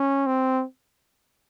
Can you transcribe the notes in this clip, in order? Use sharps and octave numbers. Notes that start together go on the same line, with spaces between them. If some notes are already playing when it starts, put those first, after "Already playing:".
Already playing: C#4
C4